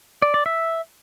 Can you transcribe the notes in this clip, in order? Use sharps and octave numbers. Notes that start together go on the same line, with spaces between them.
D5
D5
E5